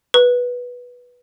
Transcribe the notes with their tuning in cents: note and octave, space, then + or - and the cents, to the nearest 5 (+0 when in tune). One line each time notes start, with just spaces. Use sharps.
B4 -10